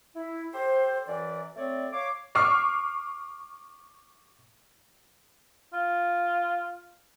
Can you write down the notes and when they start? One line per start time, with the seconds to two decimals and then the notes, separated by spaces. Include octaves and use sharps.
0.16 E4
0.54 G4 A4 C5
1.08 F#2 E3 D5
1.56 A3 C4 C#5 D5
1.92 C#5 F5 D6
2.35 C#6 D6 E6 F6 C7
5.73 F4